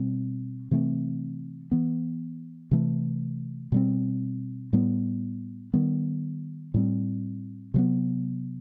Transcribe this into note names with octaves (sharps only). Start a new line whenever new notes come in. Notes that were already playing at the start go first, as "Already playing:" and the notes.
Already playing: B2 G3 C4
C3 E3 A3 C4
E3 B3
C3 E3 A3
B2 G3 C4
A2 G3 B3
D#3 G3 B3
A2 G3 C4
C3 F#3 B3